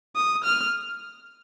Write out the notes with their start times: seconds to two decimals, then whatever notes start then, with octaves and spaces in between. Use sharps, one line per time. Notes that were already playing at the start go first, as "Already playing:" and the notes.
0.16 D#6
0.44 F6